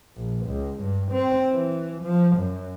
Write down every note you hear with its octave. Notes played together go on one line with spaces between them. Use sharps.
A#1
C#2
G2
C4
E3
F3
F#2